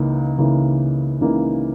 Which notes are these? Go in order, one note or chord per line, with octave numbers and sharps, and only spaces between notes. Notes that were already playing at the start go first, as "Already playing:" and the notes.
Already playing: C#2 C#3 E3 A#3 D#4
C#2 C#3 E3 A#3 D#4
C#2 C#3 E3 A#3 D#4